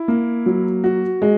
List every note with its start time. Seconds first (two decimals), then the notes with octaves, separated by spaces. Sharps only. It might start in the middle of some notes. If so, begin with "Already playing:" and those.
Already playing: E4
0.08 A#3
0.46 F#3
0.84 F#4
1.22 G#3